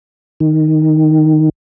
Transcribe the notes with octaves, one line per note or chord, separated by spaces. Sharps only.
D#3